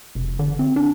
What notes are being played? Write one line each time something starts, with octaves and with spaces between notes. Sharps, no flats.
F1
D3
C4
D4